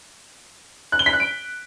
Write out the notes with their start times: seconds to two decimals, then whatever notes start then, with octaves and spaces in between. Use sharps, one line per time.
0.92 F#6
0.99 G7
1.06 B6
1.13 F#6
1.20 D7